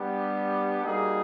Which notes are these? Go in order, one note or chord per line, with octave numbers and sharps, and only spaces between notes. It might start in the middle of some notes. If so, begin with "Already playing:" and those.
Already playing: G3 B3 D4 G4
G3 A#3 D#4 F#4 G#4